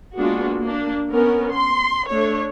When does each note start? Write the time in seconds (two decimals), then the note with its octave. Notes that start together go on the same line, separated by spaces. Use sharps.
0.18 G#3 A#3 B3 D4 F4 F#4
0.62 A#3 D4
1.10 B3 C#4 A#4
1.50 C6
2.09 A3 D4 C#5